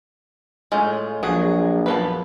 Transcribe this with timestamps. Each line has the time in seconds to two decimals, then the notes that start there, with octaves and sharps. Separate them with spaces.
0.72 A2 G#3 C#4 F4
1.23 A#1 F3 F#3 F#4 G#4
1.86 F#2 F3 B3 B4 C5 A5